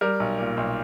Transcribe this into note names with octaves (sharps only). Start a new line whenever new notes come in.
G3 A#4
B1
A#2
B1